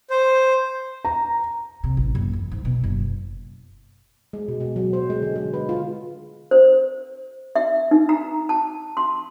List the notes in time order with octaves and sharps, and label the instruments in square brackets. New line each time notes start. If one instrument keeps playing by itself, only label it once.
[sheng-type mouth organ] C5
[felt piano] A#5
[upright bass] C3
A1
F#1
E2
G#2
B2
F#1
[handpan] G#3
B2
B2
F#3
C5
G#3
D3
G#3
B4
F4
[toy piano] C5
E5
D#4
A#5
A5
C6